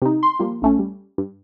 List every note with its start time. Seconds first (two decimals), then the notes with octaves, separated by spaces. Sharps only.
0.02 C3 D#4
0.23 C6
0.39 F3 G3 A#3
0.62 A1 A3 C#4
0.79 G3
1.18 G2